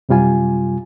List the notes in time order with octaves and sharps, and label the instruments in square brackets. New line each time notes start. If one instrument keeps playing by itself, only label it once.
[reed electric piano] F#2 C3 G3 F4 G#5